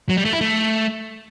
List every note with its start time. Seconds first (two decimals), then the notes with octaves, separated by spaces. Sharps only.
0.09 F#3
0.17 G3
0.25 A3
0.33 E4
0.41 A3